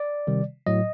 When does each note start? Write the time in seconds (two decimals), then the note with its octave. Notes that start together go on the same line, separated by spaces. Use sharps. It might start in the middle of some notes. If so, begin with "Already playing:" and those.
Already playing: D5
0.27 C3 D#3 G3
0.66 A2 F#3 D#5